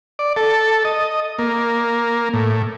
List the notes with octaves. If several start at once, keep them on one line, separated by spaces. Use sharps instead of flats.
D5
A4
D#5
A#3
A2